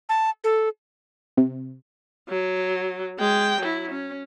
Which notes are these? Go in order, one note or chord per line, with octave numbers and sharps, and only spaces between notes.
A5
A4
C3
F#3
G#3 G5
F#3 E4
C#4